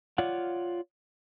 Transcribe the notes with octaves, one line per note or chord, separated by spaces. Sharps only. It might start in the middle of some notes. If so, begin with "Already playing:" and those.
F4 C#5 D5 F5 F#5